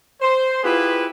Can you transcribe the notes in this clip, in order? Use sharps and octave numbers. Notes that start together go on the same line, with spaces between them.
C5
B3 E4 F4 G4 G#4 B4